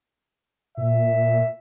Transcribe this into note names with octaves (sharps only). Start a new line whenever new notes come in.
A#2 E5